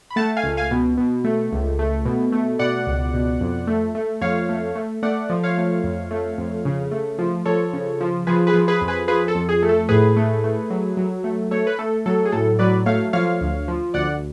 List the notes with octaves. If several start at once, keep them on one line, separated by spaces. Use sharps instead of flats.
B5
A3 F#5 A5
F5 G#5
C#2
F5 G#5
B2
B2
A3
C#2
A3
B2
A3
B2 D5 F#5
C#2
B2
F2
A3
A3
F2 C#5 F5
A3
A3
A3 D5 F#5
F3
C#5 F5
A3
F2
A3
F2
C#3
A3
F3
F3 A4 C#5
C#3
F3
F3 G#4 B4
G#4 B4
F3
G#4 B4
F2
G#4 B4
F3 G#4 B4
A4
F2
G#4
A3
A4
A2 G#4 B4
A3
A3
F#3
F#3
A3
A3 A4 C#5
B4
A3 A4
F#3 A4
G#4
A2 A4
F#3 B4 D5
A3 C#5 F5
F3 C#5 F5
D2
F3
D2 D5 F#5